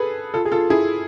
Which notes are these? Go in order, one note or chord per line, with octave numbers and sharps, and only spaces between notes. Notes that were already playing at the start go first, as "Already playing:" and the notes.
Already playing: G#4 A4 B4
F4 A4
G#4
F4 A4
E4 G#4